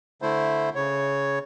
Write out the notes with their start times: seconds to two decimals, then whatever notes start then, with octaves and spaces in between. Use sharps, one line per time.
0.22 D3 A3 E4 C5
0.75 C#3 C#5